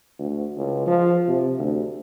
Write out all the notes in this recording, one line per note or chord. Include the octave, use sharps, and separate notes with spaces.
D2
C#2
F3
C3
D2